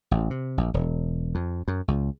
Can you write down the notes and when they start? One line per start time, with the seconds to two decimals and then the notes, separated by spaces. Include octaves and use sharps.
0.11 A1
0.30 C3
0.58 A#1
0.74 E1
1.35 F2
1.68 F#2
1.88 C#2